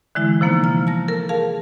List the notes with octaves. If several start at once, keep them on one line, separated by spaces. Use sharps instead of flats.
D3 E3 G#3 E4
C3 F3 A#3 B3 D#4
F6
A5 A#6
A4 A#4
G#4 F5 A5